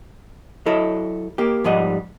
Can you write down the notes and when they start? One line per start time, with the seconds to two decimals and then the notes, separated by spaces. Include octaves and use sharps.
0.66 F#3 E4 A4 D#5
1.38 A#3 G4
1.64 G#2 F3 G3 D#5 F#5